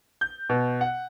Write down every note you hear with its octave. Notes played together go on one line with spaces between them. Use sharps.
G6
B2
F#5